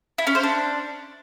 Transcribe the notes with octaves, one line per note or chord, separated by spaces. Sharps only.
E4
C#4
C5
D4